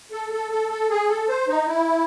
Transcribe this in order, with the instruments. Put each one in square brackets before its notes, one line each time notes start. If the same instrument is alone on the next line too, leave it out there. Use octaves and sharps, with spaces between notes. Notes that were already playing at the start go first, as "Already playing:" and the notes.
[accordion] A4
A4
A4
A4
G#4
A4
C5
D#4
E4